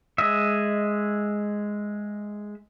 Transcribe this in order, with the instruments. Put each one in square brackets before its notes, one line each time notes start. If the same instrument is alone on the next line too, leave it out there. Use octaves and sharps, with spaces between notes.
[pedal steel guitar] G#3 D#5 E5